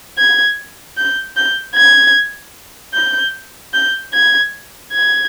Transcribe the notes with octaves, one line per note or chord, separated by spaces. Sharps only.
G#6
G6
G6
G#6
G6
G6
G#6
G#6